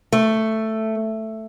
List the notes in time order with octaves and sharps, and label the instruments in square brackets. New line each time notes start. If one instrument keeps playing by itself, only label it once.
[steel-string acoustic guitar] A3